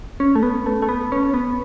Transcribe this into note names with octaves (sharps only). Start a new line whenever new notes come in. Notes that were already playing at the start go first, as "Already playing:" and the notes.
C#4
A3
B3
A3
A3
B3
C#4
B3